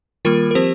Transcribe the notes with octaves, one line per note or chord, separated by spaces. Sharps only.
D#3 G3 A#3 F4 A#4
A#4
F3 C4 G4 C5